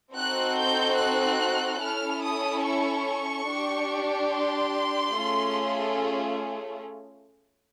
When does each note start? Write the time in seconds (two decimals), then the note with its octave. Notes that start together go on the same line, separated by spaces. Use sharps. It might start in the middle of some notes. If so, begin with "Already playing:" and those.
0.16 C4 D#4 F#4 A4 F#6
0.58 G6
0.99 F#6
1.82 C#4 E4 A4 F6
2.23 D#6
2.65 C#6
3.48 D4 G4
4.32 C6
5.16 A3 C#4 F4 G#4